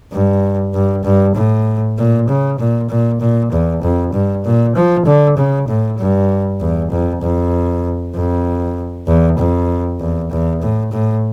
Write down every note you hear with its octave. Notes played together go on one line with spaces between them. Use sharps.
G2
G2
G2
A2
A#2
C#3
A#2
A#2
A#2
E2
F2
G2
A#2
F3
D3
C#3
A2
G2
E2
F2
F2
F2
E2
F2
E2
E2
A2
A2